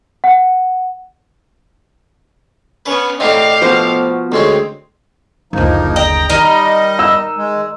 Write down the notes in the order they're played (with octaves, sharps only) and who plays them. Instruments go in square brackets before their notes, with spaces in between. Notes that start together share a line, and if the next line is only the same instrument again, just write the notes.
[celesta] F#5
[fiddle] B3 C#4 [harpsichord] B4
[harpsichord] A2 C4 [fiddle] G4 F5 [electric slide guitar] D5 D#5 G5
[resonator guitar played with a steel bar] F3 C5 [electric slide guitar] B3 F#4
[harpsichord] D2 G#3 C#4 [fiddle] C4
[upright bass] F#1 D2 [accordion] F3 A#3 D#4
[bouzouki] D#5 [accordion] G5 A#5
[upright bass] D#3 [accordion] G3 D#5 [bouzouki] D#4 A#4
[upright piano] E6
[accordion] G#3